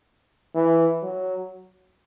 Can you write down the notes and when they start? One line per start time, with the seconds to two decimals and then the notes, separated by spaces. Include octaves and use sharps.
0.55 E3
1.02 F#3